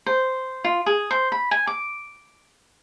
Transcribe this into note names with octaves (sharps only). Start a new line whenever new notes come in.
C5
F4
G#4
C5
B5
G#5
D6